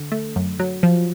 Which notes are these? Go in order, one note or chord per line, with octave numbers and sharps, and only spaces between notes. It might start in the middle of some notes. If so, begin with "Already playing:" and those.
Already playing: D3
A3
F#2
F#3
F3